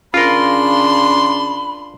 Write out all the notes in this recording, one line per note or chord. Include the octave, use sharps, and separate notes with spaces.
C#3 D4 F4 A#4 B5 C6